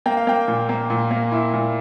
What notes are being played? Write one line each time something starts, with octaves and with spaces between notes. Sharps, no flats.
A#3 G5
F5
A#3 G5
A#2
A#3
A#2
A#3
E4
A#2